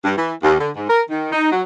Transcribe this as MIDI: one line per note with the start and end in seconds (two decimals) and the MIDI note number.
0.04 0.14 43
0.17 0.33 52
0.43 0.55 39
0.60 0.70 50
0.76 0.85 44
0.89 1.02 70
1.10 1.29 51
1.32 1.48 63
1.52 1.62 54